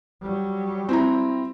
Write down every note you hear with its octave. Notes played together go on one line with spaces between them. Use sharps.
F#3 G3
C4 E4 A#5